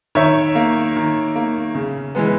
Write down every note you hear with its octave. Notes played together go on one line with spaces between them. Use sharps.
D#3 C#5 E5
A#3
D#3
A#3
C#3
E3 G#3 B3